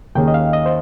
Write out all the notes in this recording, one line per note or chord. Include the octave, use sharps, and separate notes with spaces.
D#2 D#3 A#3 C#4 G#4 G5
D#5
F5
D#5
C5